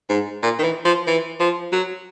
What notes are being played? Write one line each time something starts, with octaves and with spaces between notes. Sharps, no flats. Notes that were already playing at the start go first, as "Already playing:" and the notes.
G#2
A#2
D#3
E3
F3
E3
F3
F#3